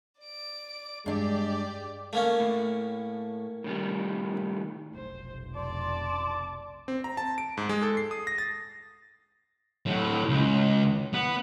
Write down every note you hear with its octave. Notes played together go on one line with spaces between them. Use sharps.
D5 D7
G2 G#3 D4 G4 D5
A3 A#3 C#4
A2
A2 D#3 G3
F1 B1 C5
D5 A5 C6 D6
C4
A#5
A5
D7
G#2
G#3
A4
C7
D#6
A#6
A6
A2 F#3
C#2
B3